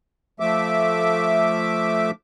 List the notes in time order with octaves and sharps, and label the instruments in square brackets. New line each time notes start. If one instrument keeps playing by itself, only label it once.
[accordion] F3 A3 E5 D6